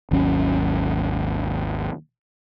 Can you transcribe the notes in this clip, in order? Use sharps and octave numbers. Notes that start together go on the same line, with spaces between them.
G#1 D#2 F#3 C#4